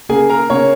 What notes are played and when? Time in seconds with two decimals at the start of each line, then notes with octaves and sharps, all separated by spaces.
0.09 C#3 A#3 G#4 G#5
0.30 A#4 A#5
0.50 C#3 A#3 C#5 C#6